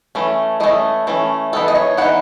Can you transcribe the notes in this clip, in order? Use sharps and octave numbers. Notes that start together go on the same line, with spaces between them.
E3 A3 C#4
E3 A3 C#4 D#5
E3 A3 C#4
E3 B3 D#4 A4
D#5
C#5
E3 B3 D#4 F#5